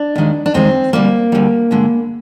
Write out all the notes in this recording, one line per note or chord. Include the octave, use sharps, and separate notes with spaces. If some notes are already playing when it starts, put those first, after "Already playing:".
Already playing: D4
D#2 D#3 G#3
D4
D#2 D#3 G#3 C4
D2 D3 G3 A#3
D2 D3 G3
G2 D3 G#3